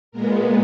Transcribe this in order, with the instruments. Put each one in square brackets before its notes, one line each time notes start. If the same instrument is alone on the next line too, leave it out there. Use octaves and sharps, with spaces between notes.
[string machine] A#2 G#3 B3 A#4